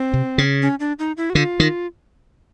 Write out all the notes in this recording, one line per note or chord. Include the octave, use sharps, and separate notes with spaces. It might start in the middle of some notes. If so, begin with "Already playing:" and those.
Already playing: C4
C3
C#3
C#4
D4
D#4
E4
F#4
D3 F4
D#3